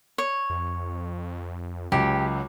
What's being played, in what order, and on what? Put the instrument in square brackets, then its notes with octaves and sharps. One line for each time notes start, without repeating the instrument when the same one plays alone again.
[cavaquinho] C#5
[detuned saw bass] F2
[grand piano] C#2 [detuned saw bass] F#3 [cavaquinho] G4